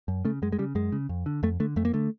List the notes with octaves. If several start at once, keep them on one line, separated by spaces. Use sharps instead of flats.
F#2
C#3 A3
F#2 G#3
G#3
C#3 G3
F#2 G#3
C#3
F2
D3
F2 A3
D3 A3
F2 A3
A#3
D3 A3